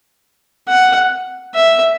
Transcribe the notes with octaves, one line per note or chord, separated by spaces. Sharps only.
F#5
E5